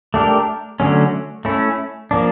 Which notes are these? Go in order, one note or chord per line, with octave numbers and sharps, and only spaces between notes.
A3 D4 G4 A#4
D3 F#3 A3 C#4
A3 C#4 E4
F3 A#3 D4